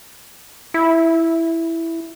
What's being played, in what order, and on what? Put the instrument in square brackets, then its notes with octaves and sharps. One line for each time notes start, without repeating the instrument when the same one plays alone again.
[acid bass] E4